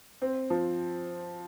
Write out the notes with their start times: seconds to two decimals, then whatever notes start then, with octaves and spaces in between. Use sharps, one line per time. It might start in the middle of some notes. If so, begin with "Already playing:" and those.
0.22 C4
0.50 F3